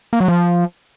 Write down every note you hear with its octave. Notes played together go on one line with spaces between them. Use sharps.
A#3
F#3
F3